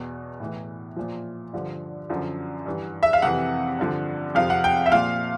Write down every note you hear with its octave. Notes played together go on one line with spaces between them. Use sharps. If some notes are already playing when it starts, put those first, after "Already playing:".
Already playing: E2 B2
A2 E3
A#2 F3
G2 D3 F3
F#2 D3 F3
G2 E3
E5
F5
F2 C3 E3 F#5
G2 D3 F3
F2 C3 F3 F5
F#5
G5
E5
A#2 F3 F5